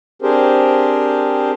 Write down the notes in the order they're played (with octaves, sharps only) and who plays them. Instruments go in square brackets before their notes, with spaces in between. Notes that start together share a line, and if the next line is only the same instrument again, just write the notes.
[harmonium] C4 D4 G4 G#4 A#4 C5